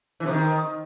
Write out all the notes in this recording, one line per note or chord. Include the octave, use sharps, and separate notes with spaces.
E3
C3
D#3